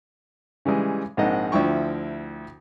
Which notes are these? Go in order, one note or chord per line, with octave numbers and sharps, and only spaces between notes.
C#3 E3 G3 G#3
A#1 G#2 A#3 C4 D#5 F#5
D2 F3 E4 G5 C#6